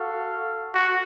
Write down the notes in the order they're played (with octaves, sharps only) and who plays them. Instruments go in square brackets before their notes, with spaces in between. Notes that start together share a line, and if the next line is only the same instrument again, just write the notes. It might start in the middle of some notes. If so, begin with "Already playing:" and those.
Already playing: [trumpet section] F#4 A4 F5
[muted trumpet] F#4